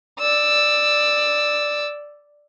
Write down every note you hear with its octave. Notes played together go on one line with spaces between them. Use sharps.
D5 E6